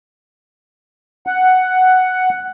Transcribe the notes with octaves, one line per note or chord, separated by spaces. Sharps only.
F#5